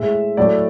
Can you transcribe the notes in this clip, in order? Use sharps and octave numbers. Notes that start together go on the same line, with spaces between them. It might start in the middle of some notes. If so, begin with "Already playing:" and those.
Already playing: A2 G#3 E5
A2 F#3 A3 D5